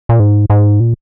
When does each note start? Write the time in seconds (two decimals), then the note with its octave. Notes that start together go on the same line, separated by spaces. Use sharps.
0.09 A#2
0.20 G#2
0.50 G#2
0.80 A#2